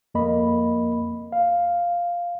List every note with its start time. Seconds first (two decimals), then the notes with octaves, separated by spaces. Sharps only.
0.14 F2 A#3 D#5 B5
1.32 F5